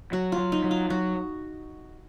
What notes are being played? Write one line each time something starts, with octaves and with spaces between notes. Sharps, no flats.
F#3 F#4
F4
F#3
D#4
F#3
F4
F#3 F#4